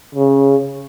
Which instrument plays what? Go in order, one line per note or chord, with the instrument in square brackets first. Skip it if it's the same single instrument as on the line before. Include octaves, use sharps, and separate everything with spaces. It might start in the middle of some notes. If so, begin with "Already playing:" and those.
[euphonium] C#3